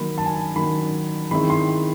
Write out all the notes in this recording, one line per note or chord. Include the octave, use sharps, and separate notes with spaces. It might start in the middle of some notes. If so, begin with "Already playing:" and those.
Already playing: D#3 F#3 A#3 B5
A5
G#5
A5
D#3 F#3 A#3 B5
D#3 G#3 C4 E4 B5
C6